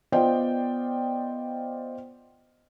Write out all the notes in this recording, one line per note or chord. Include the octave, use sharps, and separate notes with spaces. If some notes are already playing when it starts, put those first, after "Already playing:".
B3 F4 C5 D5 D#5 G5